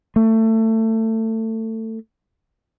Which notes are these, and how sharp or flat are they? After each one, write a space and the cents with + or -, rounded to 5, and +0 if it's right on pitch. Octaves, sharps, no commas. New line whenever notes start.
A3 +25